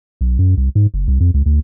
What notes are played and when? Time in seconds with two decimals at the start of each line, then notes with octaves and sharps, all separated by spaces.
0.21 B1
0.39 F#2
0.57 C2
0.75 G#2
0.94 F#1
1.08 C2
1.20 F2
1.34 C#2
1.46 D2